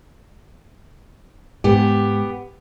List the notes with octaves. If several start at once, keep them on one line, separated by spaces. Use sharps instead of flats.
G#2 B3 G4